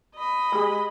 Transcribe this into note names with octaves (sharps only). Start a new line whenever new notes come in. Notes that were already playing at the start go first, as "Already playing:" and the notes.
D#5 B5
G#3 G4 G#4